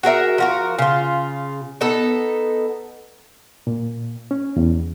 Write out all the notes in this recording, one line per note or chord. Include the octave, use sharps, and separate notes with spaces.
F#4 G#4 A#4 E5
F3 F#4 A#4
C#3 F4
B3 D#4 A4
A#2
C#4
E2